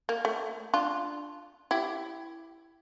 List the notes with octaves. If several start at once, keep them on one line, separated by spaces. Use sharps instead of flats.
A#3
A3
D4 F4
E4 G4